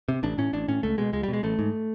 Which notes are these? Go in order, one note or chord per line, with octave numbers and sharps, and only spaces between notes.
C3
A1 D4
A2 C#4
A1 D4
A2 C#4
C#2 A3
B2 G#3
C#2 G#3
G3
B2 G#3
A1 A3
G#2